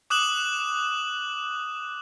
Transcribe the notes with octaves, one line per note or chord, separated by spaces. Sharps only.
D6 D#6 F#6 E7 F#7